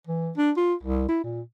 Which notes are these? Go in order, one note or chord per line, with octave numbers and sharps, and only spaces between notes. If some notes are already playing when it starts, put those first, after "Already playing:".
E3
D4
F4
C2
E4
A#2